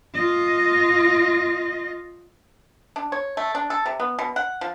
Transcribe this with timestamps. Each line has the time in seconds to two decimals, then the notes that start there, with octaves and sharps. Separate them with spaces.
0.14 F4 D#5
2.96 D4
3.12 C#5
3.37 A3
3.55 D4
3.70 A4
3.86 C3
4.00 B3
4.19 B2
4.36 F#5
4.61 F3